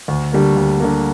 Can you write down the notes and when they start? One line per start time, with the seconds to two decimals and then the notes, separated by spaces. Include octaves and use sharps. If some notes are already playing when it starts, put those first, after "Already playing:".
0.08 D2
0.32 D3 G3 A#3
0.56 D2
0.80 D3 G3 A#3